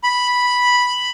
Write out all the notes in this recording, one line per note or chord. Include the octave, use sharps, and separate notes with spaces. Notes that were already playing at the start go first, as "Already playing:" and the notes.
B5